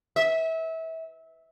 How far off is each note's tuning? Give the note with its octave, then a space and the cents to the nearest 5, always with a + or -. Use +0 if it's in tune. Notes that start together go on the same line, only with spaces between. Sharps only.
E5 -25